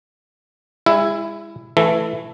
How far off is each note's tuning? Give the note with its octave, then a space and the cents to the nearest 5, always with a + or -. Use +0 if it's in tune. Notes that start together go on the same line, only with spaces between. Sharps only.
G#3 -35 E4 +10
E3 +10 A3 +0 A4 +0